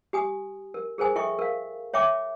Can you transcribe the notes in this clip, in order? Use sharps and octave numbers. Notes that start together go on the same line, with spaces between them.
G4 G#5 D#6
A#4
G#4 A#4 C5 G#5 D#6
E4 A4 D#5 E5 G5 C#6
A#4 F5
C#5 E5 G5 D6